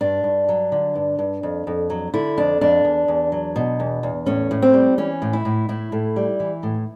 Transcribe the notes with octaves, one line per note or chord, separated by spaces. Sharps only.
G2 D4
G2
F#3
D3
G2
G2
F2
F2
F#3
D3 E4
F2 D4
F2 D4
E2
E2
F#3
B2
E2
E2
A2 C#4
A2
C4
G3
E3 C#4
A2
E4
A2
A2 E4
A2
G3
E3
A2